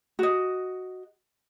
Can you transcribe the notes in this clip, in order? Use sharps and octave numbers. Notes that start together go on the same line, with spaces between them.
F#4 D#5